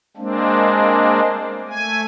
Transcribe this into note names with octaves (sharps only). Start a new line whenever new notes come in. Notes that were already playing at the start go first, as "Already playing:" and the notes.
G#3 A#3 C4 D4
A3 G#5